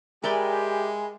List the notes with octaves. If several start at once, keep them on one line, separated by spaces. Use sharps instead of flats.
G#3 G4 A#4 D5 E5 G5 G#5 B5